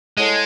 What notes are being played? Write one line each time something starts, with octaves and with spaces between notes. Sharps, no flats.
G#3 E4 A4 C#5 F#5 A5